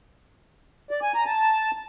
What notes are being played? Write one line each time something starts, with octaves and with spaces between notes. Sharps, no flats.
D5
G#5
A#5
A5